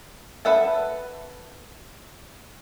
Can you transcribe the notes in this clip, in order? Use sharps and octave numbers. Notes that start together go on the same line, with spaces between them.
A4 B4 E5 F#5 A5